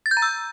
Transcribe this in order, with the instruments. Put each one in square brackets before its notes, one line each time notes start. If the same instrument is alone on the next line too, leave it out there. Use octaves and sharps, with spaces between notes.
[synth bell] A6
G6
A#5
E6